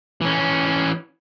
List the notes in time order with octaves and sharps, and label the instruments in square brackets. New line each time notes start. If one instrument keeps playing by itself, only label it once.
[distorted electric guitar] E3 C#4